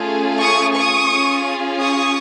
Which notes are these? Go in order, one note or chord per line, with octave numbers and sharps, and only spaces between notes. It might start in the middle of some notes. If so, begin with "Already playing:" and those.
Already playing: A3 C#4 F4 G#4
C#6 D#6
C#6 D#6
C#4 F4 G#4
C#6 D#6